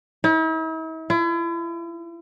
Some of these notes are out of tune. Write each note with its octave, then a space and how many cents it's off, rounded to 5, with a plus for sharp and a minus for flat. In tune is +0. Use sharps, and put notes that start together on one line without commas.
E4 -45
E4 +40